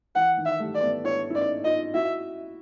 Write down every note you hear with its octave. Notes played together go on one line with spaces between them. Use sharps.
E3 F#5
D#3
E5
G3 A3
D5
A3 B3
D4 E4 C#5
E4
C#4 D#4 D5
D#4 F4 D#5
E4 F#4 E5